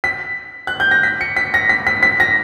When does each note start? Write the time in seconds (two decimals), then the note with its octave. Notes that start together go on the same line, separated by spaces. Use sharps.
0.04 B6
0.67 F#6
0.80 G6
0.91 A#6
1.03 B6
1.21 C#7
1.37 B6
1.54 A#6
1.69 B6
1.87 B6
2.03 B6
2.20 A#6